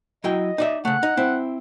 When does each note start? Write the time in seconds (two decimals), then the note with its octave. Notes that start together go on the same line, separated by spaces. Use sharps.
0.24 F#3 E4 D#5 G5
0.58 D#4 D5 E5
0.85 C#3 A3 F#5
1.03 D#4
1.17 C4 E4